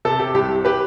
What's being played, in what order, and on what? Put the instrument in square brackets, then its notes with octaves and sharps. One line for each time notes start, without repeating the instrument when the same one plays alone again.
[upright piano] C3 A4
G4
C2 G4
G4 B4